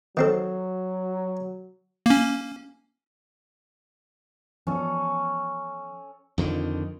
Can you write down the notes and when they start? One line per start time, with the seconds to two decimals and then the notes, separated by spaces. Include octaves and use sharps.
0.17 D#3 F#3 C4 A4
2.06 A#3 C#4
4.67 E3 F3 B3 C#4 A4
6.38 F2 D3 D#3